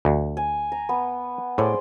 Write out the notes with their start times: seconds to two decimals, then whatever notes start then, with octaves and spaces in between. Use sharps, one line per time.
0.05 D2
0.37 G#5
0.72 A#5
0.89 B3
1.58 A2 G#4 C5 D5